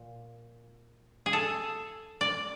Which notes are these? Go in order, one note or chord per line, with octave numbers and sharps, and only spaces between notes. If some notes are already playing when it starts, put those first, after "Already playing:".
Already playing: A#2
G#4
A4
D5